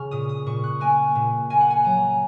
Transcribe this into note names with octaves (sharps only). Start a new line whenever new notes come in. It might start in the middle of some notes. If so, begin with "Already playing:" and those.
Already playing: C#3 C#6 F6
A#2 D#6
D#6
A#2 C#6
F#6
A#3 G#5
A#2
A#3 G#5
F#5
G#5
F#3 A#5